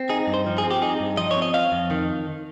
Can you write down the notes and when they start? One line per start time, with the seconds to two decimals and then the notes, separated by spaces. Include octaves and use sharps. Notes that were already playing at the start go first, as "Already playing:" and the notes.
Already playing: C4
0.09 D#4 G#4
0.27 G2
0.34 C5
0.46 F3
0.58 G#4
0.64 C4
0.71 G4
0.82 D#4 G#4
1.00 G2
1.17 F3 D#5
1.31 C#5
1.37 C4
1.42 D#5
1.54 C4 F5
1.72 F2
1.91 D#3